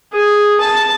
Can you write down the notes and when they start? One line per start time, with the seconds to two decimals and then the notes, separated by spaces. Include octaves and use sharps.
0.13 G#4
0.60 A5